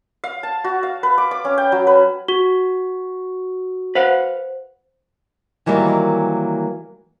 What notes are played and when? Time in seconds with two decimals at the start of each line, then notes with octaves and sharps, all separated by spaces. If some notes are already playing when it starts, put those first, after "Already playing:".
0.24 F5
0.43 A5
0.64 F#4
0.83 F5
1.03 B4
1.18 D6
1.31 D6
1.45 C#4
1.58 G5
1.72 F#3
1.87 B4
2.28 F#4 G7
3.95 B4 C5 F5 F#5
5.66 D#3 E3 F#3 G3 A#3